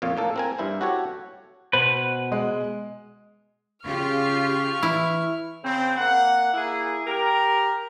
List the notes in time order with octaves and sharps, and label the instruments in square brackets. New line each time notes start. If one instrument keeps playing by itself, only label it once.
[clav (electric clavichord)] F2 A#2 F4 C#5 F5
A2 A#3 A4
C4 A#4 G#5
G2 E4 C5
F#4 G4 A4 C#5
[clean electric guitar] B2 B4 [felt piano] C5
[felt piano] G#3
[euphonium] C#3 [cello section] F4 G4 [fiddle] C#6 F6
[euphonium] E3 [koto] E4
[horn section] C#3 C4
A#3 F#5
A#3 E4 G#4
G4 A#4